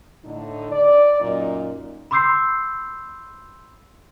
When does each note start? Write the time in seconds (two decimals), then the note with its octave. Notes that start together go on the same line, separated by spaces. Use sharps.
0.24 A2 D3 D#4
0.71 D5
1.20 F#2 A#2 D#4
2.11 B5 C6 D6 E6 G6 C7